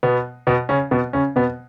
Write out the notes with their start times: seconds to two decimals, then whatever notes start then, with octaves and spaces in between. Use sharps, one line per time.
0.03 B2 B3
0.47 B2 B3
0.69 C#3 C#4
0.91 B2 B3
1.13 C#3 C#4
1.36 B2 B3